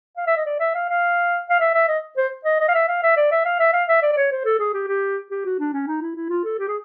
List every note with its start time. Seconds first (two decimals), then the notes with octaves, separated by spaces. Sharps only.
0.17 F5
0.27 E5
0.36 D#5
0.46 D5
0.60 E5
0.75 F5
0.89 F5
1.49 F5
1.60 E5
1.74 E5
1.88 D#5
2.17 C5
2.45 D#5
2.60 D#5
2.68 F5
2.75 E5
2.88 F5
3.03 E5
3.16 D5
3.31 E5
3.45 F5
3.59 E5
3.73 F5
3.88 E5
4.02 D5
4.12 D5
4.17 C#5
4.31 C5
4.44 A4
4.59 G#4
4.73 G4
4.87 G4
5.31 G4
5.45 F#4
5.59 D4
5.73 C#4
5.87 D#4
6.02 E4
6.16 E4
6.30 F4
6.44 A4
6.59 G4
6.68 G#4